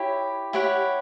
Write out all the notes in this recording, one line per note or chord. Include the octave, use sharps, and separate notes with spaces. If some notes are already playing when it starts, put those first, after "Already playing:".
Already playing: E4 G4 C#5
E4 G4 C#5 F#5